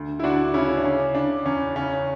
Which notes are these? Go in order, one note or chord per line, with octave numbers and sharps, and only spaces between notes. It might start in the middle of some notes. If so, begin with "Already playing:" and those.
Already playing: D2
E4
D2 D4 F#4
C#3 C#4 E4
D4
C#3 C#4
C#3 D4
E2 C#4
C#3 C#4